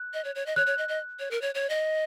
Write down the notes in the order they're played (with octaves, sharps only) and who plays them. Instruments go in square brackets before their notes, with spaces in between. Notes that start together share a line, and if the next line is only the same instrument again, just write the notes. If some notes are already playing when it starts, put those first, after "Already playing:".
Already playing: [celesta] F#6
[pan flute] D#5
C#5
C#5
D#5
[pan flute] C#5 [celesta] F#6
[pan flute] C#5
D#5
D#5
C#5
A#4
C#5
C#5
D#5